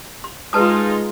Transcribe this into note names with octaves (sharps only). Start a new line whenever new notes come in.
C6
G#3 D#4 F4 B4 A5 D#6